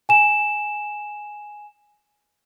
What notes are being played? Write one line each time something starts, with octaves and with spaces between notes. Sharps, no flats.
G#5 E7